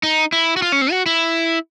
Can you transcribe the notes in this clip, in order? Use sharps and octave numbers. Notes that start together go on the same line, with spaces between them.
D#4
E4
F#4
F4
C#4
C4
F#4
E4